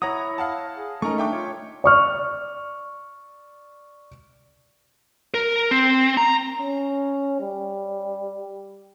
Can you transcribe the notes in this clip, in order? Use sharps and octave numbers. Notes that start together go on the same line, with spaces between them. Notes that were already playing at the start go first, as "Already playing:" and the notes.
E4 C#5 F#5 A#5 D#6 A#6
F5 F#5 A5
G#4
A3 C#4 D#4 A#4 A#5 C#6
D4 E5 G5 D6
F4 C#5
D5 C#6 F6
A#4
C4
A#5
C#4
G3